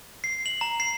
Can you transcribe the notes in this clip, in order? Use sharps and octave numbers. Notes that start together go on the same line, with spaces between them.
C7
F#7
A#5
C7